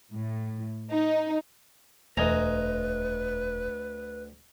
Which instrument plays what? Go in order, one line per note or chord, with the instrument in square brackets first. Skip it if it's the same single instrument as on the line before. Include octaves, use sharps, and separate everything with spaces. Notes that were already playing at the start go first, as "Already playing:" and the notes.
[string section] A2
D#4
[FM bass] E1 [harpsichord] D2 [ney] B4 [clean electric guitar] D#5 G#5 A#5